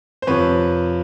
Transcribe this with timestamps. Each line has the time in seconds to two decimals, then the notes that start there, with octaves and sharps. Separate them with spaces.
0.22 C5
0.27 F2 C3 F3 B4 C#5